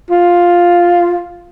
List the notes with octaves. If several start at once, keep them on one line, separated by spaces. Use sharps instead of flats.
F4